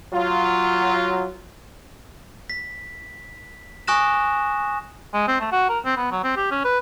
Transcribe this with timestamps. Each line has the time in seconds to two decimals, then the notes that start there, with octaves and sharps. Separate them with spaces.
0.13 F#3 F4
2.50 B6
3.87 G#5 C#6 D#6 F#6 A#6 E7
5.14 G#3
5.28 C4
5.40 A3
5.52 F#4
5.69 A#4
5.85 C4
5.97 B3
6.12 F#3
6.24 C4
6.37 G4
6.51 C#4
6.65 B4